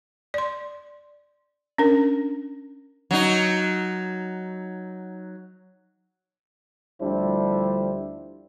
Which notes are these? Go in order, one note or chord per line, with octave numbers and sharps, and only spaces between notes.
D5 C6
C#4 D4 A#4
F#3 D#4
D2 F3 G3 D4 E4 C5